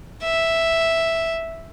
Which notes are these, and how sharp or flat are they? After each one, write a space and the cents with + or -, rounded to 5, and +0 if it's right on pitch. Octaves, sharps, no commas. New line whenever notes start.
E5 +0